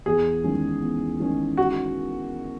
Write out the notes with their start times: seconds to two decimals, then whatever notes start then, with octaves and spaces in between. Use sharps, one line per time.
0.06 E2 G#4
0.43 D#3 G#3 C#4
0.82 E2
1.20 D#3 G#3 C#4
1.57 F#4